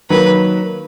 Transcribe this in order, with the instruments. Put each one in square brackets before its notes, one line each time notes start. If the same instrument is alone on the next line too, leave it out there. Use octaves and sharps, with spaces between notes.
[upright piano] D#3 F#3 A#3 [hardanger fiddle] B4